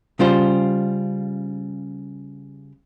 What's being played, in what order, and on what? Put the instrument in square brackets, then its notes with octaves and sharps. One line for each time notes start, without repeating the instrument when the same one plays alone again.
[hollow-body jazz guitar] C#3 G3 F4 C5